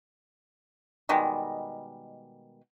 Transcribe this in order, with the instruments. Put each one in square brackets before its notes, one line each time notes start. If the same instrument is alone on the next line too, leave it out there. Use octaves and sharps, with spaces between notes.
[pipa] B2 D#3 G3 G#3